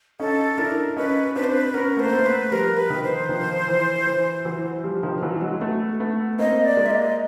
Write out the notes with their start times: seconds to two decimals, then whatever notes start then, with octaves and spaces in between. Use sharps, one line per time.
0.19 C#4 D#4 A4
0.58 D4 E4 A#4
0.97 C#4 D#4 B4
1.35 C4 D4 B4
1.44 C5
1.52 B4
1.74 B3 C#4 A#4
1.97 A3 C5
2.05 A#3
2.13 A3 B3
2.26 B4
2.52 F3 G3 A#4
2.77 B4
2.90 D#3 F3
3.04 C5
3.29 D#3 F3
3.68 E3
4.07 E3
4.45 E3 F#3
4.84 F3 G3
5.03 D#3 F3
5.23 E3 F#3
5.42 F#3 G#3
5.61 A3 B3
6.00 A3 B3
6.39 A#3 C4 D#5
6.65 D5
6.77 G#3 A#3
6.86 E5
6.90 D#5